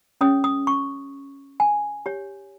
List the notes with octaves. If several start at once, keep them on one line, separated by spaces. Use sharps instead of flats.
C#4 G#4 C#5 D#6
D#6
C#6
G#5
G4 C#5